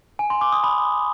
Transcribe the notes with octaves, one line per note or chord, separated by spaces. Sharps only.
G#5
C6
D6
D#6
B5